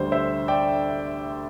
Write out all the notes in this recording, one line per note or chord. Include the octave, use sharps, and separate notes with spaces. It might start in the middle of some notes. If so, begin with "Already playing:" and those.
Already playing: D2 D3 G3 C5
C5 E5
D5 G5